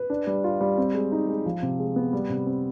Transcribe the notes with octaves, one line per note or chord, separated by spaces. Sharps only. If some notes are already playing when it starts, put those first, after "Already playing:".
Already playing: B4
D4
G3
F4
G3
C4
G#3
D#4
G#3
F3
C3
G#3
B3
G3
C3
C4